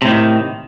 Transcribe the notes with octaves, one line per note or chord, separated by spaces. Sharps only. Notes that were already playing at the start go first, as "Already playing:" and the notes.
A2 C3 D#3